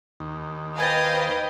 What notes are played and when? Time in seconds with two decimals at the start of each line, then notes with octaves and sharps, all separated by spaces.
0.20 D#2
0.78 B4 C5 D#5 F5 G5 G#5 G#6 A6